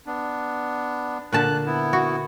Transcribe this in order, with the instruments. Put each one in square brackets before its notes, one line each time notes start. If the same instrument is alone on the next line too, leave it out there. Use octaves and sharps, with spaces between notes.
[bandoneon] B3 D4
[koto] A#2 D3 A5 [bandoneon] F#6
[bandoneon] B3 E4
[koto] F#4